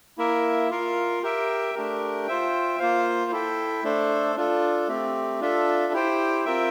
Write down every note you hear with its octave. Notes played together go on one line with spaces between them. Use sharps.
A#3 E4 A#4 E5
F4 A#4 F5
G4 A#4 E5 G5
A3 D4 G4 A#4
F4 C5 E5 G5
A#3 F4 C5 F5
E4 A4 E5 G5
A3 D4 A4 C5
D4 F4 A4
A3 C4 G4
D4 F4 A4 E5
E4 G4 C5 G5
C4 F4 A#4 E5 G5